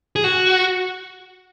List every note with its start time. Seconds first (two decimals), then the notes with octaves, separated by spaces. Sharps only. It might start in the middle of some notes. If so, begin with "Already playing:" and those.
0.16 G#4
0.24 F#4